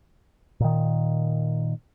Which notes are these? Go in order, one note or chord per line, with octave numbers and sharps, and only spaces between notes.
A#2 D#3